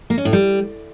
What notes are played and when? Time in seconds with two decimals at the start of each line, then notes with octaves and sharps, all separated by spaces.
0.10 A#3
0.18 C#4
0.25 A2
0.33 G3